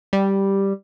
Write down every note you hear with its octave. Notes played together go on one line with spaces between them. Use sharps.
G3